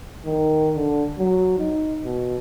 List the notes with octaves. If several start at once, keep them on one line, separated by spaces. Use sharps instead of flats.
D#3
D3
F#3
D#4
B2